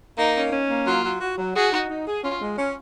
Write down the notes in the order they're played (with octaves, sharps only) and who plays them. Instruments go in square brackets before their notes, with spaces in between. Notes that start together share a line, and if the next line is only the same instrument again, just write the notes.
[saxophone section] A#3 [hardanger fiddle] D#4
[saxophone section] C#4
C#4
A#3
[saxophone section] F#3 [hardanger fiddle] F4
[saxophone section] F#3
F#4
F#3
[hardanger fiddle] F#4 [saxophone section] G#4
[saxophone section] D#4
D#4
G#4
[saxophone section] C#4 [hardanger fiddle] F4
[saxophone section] G#3
C#4